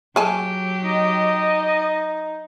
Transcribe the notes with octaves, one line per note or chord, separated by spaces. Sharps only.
F#3 G4 G#4 G#5 A5
D#4 D#5